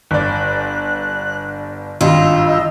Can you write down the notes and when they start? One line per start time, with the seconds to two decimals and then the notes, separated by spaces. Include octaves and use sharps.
0.11 G1 D5 F#6
2.01 G#1 G2 D#3 F4 D#5 G5 E6
2.47 D#5